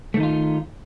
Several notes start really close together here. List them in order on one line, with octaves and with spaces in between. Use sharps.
A3 D#3 D#4 F4